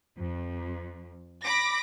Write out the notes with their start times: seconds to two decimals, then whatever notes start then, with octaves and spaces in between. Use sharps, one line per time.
0.19 F2
1.45 B5 D6 A#6